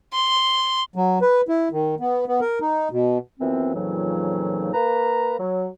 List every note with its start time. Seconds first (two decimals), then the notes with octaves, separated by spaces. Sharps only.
0.13 C6
0.96 F#3
1.22 B4
1.48 E4
1.72 D#3
2.00 B3
2.27 B3
2.41 A#4
2.61 D#4
2.91 B2
3.40 F#2 E3 F3 B3 C4
3.74 F2 A#2 C#3 E3 F#3 D#4
4.74 A#3 B4 A#5
5.39 F#3